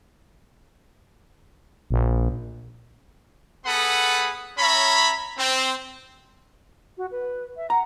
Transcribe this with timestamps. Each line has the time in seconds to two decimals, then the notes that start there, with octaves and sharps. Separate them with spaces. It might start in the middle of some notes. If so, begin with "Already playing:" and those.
1.91 A#1
3.65 B3 G#4 A4 F#5 B5 D#6
4.58 C#4 C#5 E5 A#5 B5
5.38 C4
6.97 F#4
7.11 B4
7.57 E5
7.70 F#5 A#5